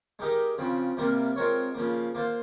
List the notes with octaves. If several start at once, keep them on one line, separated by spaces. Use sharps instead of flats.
G#3 D#4 G4 A#4 D#5
C#3 F3 C4
C3 G3 A#3 F4 A#4
G#3 C4 F4 A#4 C#5
C#3 F3 A#3
A#3 F4 C5